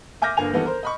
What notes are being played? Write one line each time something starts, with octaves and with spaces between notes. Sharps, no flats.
E5 G#5 D6 F6 G6 A#6
G1 D3 A#3 G#5 F7
D#3 E3 G3 B3 A4
A#4 C5
D#5 B5 C#6